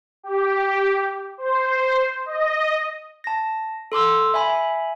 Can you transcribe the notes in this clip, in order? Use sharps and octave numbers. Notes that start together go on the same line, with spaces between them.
G4
C5
D#5
A5 A#6
A4 C6 D6 E6
E5 G#5 B5